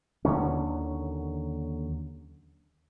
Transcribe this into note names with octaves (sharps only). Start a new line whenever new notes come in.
D#2 D3 F#3 C#4